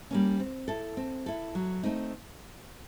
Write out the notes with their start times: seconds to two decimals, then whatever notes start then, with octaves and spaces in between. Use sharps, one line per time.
0.11 G3 A#3 C#4
0.40 C4
0.68 E4 A4
0.97 C4
1.26 E4 A4
1.55 F#3
1.83 A3 C4 D#4